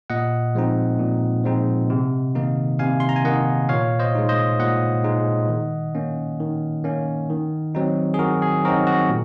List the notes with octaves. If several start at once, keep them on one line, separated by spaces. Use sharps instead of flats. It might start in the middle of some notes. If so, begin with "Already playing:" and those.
A#2 D#5 F#5
F3 G#3 C4 D#4
A#2
F3 G#3 C4 D#4
C3
D#3 A#3 D#4
C3 F5 G#5
C6
A#5
G#5
D#3 A#3 D#4 D#5 F#5
A#2 C#5 F5
C5 D#5
G#3 D#4
C5 D#5
A#2 D#5 F#5
G#3 D#4
D#3
A#3 C#4
D#3
A#3 C#4
D#3
F#3 C4 D#4
G#4
D#3 F#4 A#4
G#4
F#3 C4 D#4 F#4 A#4
F#4
A#2